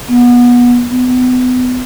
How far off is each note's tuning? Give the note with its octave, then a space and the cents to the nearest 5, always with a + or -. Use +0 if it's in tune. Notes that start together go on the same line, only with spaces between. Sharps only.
B3 -25
B3 +35